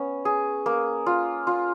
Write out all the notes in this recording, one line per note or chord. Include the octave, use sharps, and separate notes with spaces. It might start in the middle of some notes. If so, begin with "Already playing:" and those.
Already playing: B3 C#4
G#4
A#3
F4
F4